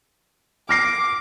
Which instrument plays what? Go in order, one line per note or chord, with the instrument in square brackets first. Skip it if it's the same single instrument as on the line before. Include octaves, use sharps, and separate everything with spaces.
[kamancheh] D6 [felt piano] F6 A#6 C7